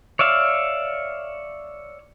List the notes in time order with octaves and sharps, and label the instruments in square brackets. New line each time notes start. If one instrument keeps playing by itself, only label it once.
[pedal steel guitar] C#5 D5 E5 F5